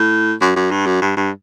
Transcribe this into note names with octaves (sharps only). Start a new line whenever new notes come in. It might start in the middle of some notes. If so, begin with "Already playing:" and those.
Already playing: A2
F#2
F#2
G2
F#2
G2
G2